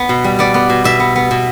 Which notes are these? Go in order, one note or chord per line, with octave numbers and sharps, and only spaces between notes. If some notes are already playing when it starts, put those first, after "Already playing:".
Already playing: B3
B2
G3
B3 D5
B3
B2
B2 E5
B3
B3
B2